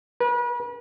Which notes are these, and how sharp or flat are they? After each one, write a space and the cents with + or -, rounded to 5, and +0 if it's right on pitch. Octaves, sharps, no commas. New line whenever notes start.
B4 -40